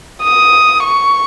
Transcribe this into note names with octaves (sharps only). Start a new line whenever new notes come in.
D#6
C#6